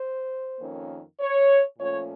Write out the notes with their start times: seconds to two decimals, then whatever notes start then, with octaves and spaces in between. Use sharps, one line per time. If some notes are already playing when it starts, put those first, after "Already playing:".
Already playing: C5
0.60 F2 D#3 A#3 C#4
1.19 C#5
1.78 A#2 F3 A3 C#4 C#5